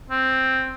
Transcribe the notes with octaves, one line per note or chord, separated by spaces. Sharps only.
C4